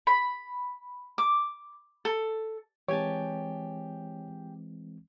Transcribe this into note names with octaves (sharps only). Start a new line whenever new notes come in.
B5
D6
A4
E3 G#3 C4 G4 C#5 G#5 A5